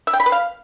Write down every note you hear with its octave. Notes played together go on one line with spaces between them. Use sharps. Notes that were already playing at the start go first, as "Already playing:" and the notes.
E5
G5
B5
B4
F5